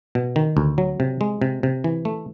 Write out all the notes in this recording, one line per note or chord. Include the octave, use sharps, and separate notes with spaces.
B2
D#3
D2
F#3
C3
G#3
C3
C3
E3
A3